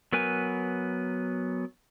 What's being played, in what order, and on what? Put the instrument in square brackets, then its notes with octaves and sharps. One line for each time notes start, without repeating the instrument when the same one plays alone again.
[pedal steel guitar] F#3 B3 A#4 B4 G#5